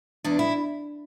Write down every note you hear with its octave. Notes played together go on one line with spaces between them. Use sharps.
E2 D4
E4